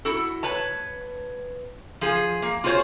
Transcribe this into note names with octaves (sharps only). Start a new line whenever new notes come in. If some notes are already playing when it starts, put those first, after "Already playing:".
E4 F#4 A4
B4 C#5 A5
F3 G#4
A#3
F4 F#4 G#4 C5 C#5